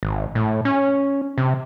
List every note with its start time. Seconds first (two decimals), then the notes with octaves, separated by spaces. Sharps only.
0.03 G#1
0.35 A2
0.65 C#4
1.38 C3